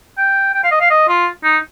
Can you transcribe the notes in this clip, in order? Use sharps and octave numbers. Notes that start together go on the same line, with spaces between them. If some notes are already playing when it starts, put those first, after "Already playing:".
G5
G5
F5
D#5
F5
D#5
F4
D#4